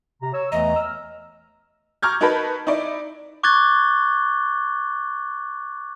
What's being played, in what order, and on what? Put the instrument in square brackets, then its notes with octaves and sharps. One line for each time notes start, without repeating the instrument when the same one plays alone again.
[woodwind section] C3 A#5
[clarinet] C#5 [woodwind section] E6
[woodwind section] E2 E3 A3 [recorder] D#5 [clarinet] A#5
[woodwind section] E6 F6
[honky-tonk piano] A#5 C#6 D6 F6 G6 G#6
D#4 F#4 A#4 B4 A5 B5
D#4 E4 D5
[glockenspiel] C#6 D6 F#6 G#6 A6 G7